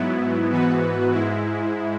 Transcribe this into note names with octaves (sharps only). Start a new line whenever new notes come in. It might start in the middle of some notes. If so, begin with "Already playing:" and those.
Already playing: G#2 F#3 B3 E4
G#2 E3 B3 F#4 B4
G#2 G#3 E4